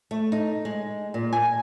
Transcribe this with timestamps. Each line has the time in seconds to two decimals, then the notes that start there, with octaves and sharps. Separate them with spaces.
0.11 A3
0.32 D#4
0.65 G#3
1.14 A#2
1.33 G#5